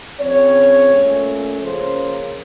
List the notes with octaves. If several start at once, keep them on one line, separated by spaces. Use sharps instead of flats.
C#3 F3 C4 C#5
A#2 A3 C#4
C#3 F3 A#3 C#4 C5